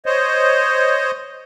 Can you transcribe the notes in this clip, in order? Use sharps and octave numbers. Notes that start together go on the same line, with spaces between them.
C5 C#5 D#5